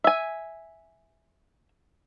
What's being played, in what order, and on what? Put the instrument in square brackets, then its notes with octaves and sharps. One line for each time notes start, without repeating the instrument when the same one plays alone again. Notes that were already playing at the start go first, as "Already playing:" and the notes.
[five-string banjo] E5 G#5